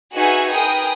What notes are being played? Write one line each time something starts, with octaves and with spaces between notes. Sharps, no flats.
D#4 F#4 G#4 B4 E5 G#5
G#4 A#4 B4 G5 D#6